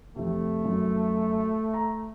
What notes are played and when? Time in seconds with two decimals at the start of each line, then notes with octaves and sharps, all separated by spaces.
0.16 F2 C3 A3
0.65 F#2
1.74 A#5